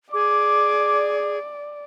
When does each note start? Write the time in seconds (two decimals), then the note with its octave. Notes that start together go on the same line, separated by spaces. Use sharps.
0.14 G#4 D5 D6